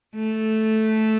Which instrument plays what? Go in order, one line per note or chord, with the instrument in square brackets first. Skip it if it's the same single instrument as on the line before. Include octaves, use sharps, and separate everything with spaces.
[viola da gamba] A3